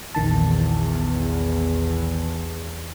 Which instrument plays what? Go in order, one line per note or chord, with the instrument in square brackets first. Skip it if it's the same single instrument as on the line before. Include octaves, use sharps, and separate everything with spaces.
[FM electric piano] A#1 D#3 A5 [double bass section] E2